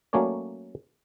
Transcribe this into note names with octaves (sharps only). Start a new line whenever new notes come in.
F#3 A3 A#3 C#4 C#5 D5